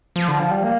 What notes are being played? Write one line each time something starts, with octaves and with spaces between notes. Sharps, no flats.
F3
D3
F3
G3
A#3